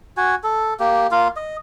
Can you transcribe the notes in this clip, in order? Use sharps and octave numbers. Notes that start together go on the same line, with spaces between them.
F#4 G#5
A4
A#3 G4
A#3 F4 F5
D#5